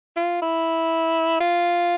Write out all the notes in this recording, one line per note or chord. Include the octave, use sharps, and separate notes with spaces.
F4
E4
F4